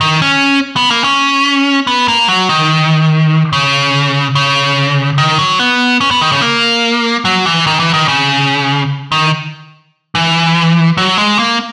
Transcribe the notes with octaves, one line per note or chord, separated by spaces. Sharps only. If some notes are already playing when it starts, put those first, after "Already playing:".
D#3
C#4
B3
A#3
C#4
B3
A#3
F#3
D#3
C#3
C#3
D#3
F#3
B3
C#4
B3
D#3
C#3
A#3
F#3
E3
D#3
E3
D#3
C#3
D#3
E3
F#3
G#3
A#3